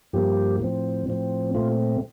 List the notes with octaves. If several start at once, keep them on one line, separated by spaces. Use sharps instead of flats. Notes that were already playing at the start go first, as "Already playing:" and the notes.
G2 F3 A#3 G4
A2 F3 C4
A2 F3 C4
A#2 A3 C4 F4